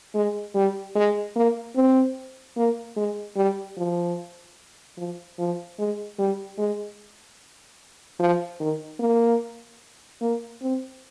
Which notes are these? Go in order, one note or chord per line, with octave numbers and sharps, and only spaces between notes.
G#3
G3
G#3
A#3
C4
A#3
G#3
G3
F3
F3
F3
G#3
G3
G#3
F3
D#3
A#3
A#3
C4